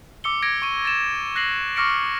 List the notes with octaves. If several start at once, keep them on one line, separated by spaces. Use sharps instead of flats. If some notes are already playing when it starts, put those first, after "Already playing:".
D6 E6 C#7 G7
G#6 A#6 D7
C#6 D#7
A6 E7
F#6 A#6 C7 F#7
C#6 D6 F6 A#6 C#7 D7